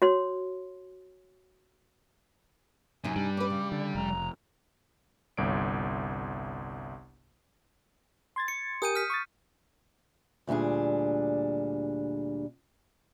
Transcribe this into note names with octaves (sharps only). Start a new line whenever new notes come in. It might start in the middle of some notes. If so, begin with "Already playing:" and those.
F#4 C#5 C6
F#2 C3 D#4 G#5
G2 G3
C#4 B4 D6
C#3
D3 D5
F1 A#5
G1 C2 C#5 D7
C6 G#6 A6
C#7
G4 A#4 G#5 D#6 G6 D#7
F6 B6
C#6 D#6 A6
D2 A#2 G3 D4 G#4